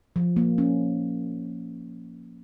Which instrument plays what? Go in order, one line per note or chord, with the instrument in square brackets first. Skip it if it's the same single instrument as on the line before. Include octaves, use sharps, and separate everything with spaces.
[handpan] F3
A#3
C#4